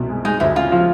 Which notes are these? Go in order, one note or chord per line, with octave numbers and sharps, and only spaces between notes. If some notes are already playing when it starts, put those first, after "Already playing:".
Already playing: C2 B2
G#3
G#3 D#4
D2 E4
C#3 F4
F3